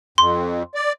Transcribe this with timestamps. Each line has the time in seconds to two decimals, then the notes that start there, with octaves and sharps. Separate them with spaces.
0.18 F2 C6
0.75 D5